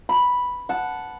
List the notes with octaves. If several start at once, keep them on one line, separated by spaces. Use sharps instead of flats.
B5
F#5 A5